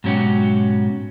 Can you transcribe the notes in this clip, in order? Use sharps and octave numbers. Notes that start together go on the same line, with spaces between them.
G#2 B2 F#3 C#4 F#4 G4